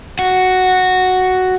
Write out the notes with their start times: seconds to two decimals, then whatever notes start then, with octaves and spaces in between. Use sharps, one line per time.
0.19 F#4